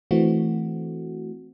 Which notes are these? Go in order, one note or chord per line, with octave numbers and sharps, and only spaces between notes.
E3 A3 C4 F#4